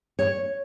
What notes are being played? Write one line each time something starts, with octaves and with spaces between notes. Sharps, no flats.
C#5